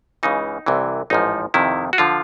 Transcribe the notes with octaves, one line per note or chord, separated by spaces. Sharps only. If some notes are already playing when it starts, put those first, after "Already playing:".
C#2 C#3 E3 D#4
C2 C3 E3
A1 G#2 F3 D#4
F2 C3 D#3 E4
F#4
D3 F3 F4